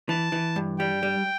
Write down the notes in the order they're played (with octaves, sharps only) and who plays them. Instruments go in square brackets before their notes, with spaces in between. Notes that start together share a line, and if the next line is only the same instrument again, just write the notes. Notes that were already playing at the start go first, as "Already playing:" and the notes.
[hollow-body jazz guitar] E3 [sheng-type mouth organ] A5
[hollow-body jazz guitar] E3
G2
[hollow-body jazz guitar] G3 [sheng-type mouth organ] G5
[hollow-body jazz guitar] G3